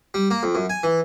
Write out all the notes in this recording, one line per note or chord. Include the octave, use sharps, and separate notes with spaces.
G3
A#3
F2
F#2
G#5
E3